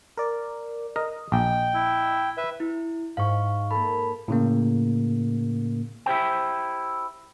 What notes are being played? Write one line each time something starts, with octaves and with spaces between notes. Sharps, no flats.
A#4 D5
A#4 D#5
A#1 G5
E4
B4 E5
E4
G#2 F5 C#6
A#3 A4 B5
A2 C#3 A#3
E4 G4 C5 G5